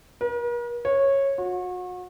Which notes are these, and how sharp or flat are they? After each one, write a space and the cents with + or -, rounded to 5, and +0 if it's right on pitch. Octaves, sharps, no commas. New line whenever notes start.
A#4 +45
C#5 -15
F#4 -35